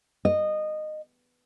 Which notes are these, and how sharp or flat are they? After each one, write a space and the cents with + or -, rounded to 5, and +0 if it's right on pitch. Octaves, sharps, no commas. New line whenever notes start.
D#5 -15